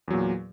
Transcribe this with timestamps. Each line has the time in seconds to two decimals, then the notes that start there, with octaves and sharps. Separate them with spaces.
0.08 E2
0.10 F#3
0.13 A#2